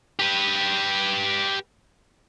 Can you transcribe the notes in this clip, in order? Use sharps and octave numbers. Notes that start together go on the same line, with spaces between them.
G4 B4